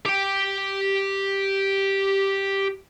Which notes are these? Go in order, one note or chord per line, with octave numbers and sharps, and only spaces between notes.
G4 G5